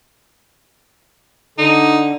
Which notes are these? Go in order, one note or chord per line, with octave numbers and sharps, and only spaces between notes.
D3 D#4